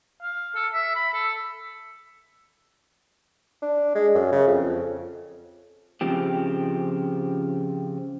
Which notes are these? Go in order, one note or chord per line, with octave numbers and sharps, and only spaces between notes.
F5
A4
E5
B5
A4
D4
G#3
F#2
C#3
F2
C#3 F3 C4 G4